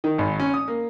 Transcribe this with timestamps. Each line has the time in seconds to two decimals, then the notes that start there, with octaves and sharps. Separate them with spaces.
0.04 D#3
0.18 G#1
0.40 C#4
0.54 D#6
0.68 A#3